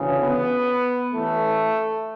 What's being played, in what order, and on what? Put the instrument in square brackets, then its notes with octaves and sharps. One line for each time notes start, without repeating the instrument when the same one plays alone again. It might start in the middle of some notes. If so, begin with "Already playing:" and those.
Already playing: [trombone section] D2 C#3 E3
B3
A1 A2 E3 A3